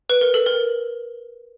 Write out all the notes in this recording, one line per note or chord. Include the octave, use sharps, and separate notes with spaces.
B4
A#4
A4
A#4